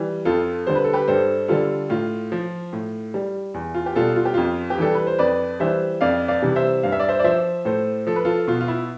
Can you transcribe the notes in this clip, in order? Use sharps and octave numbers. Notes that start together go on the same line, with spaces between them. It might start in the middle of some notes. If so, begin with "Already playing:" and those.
Already playing: E3 G3
F2 F4 A4
D3 G3 C5
B4
A4
G4 B4
G2 A4 C5
D3 G3 F4 A4
A2 F4
F3
A2
G3
E2
F4
G4
B2 G3 F4 A4
F4
G4
F2 F4
G4
E3 G3 A4
B4
C5
F2 B4 D5
E3 G3 C5 E5
F2 D5 F5
D5 F5
C3 E3 G3
C5 E5
G2 F5
E5
D5
C5 E5
D5
F3 C5 E5
A2 A4 C5
F3 A4
B4
F4 A4
B2 F4
F4
E4